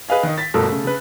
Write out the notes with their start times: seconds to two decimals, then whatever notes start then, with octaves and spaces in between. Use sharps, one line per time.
0.09 G#4 B4 D#5 F5 G#5
0.23 D#3 D#4
0.38 A6 B6
0.54 G1 B2 A3 A4 A#4 E6
0.69 C#3 A3
0.84 C#3 B4